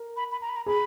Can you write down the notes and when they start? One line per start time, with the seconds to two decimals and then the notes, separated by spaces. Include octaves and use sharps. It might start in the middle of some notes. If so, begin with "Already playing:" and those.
Already playing: A#4
0.16 B5
0.32 B5
0.41 A#5
0.49 B5
0.56 A#5
0.66 G#4 B5